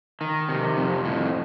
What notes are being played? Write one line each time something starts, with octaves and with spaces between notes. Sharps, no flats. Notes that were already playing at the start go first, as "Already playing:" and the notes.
D#3
C3
F2
A2